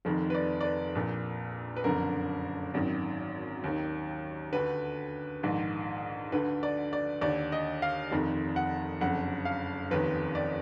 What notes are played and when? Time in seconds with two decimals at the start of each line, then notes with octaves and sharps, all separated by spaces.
0.05 F1 F2 D#3
0.30 B4
0.35 D5
0.61 D5
0.65 B4
0.95 A#1 A#2
1.76 B4
1.84 F#1 F2 D3 A#4
2.74 G#1 F#2 D#3
3.64 D#2 D#3
4.53 D2 D3 B4
5.43 A#1 G#2 D#3
6.32 D2 D3 B4
6.63 D5
6.93 D5
7.21 D#2 D5
7.26 D3
7.52 D#5
7.82 F5
8.12 F1 F2 D#3
8.56 F#5
9.01 F#1 F2 D3 F#5
9.45 F5
9.91 F1 D#2 D#3 B4
10.35 D5